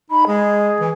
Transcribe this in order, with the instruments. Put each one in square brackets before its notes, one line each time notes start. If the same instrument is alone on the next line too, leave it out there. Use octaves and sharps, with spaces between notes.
[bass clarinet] D#4 [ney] B5
[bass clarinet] G#3 [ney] G#4
[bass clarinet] E3